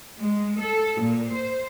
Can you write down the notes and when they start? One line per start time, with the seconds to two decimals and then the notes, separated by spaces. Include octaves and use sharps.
0.19 G#3
0.60 A4
0.99 A#2
1.33 C5